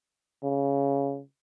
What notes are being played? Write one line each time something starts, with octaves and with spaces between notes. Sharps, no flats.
C#3